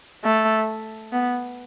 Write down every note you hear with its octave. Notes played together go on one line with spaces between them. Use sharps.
A3
B3